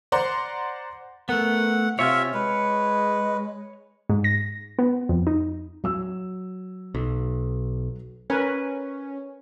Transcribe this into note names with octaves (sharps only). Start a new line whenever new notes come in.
C5 D5 F#5 A#5 C6
A3 B3 A#4 F#5
C3 F4 C#5 E5 G#5 F6
G#3 B4
G#2
A#6
B3
F2
D#4
F#3 E6
B1
C#4 A#4 B4 G#5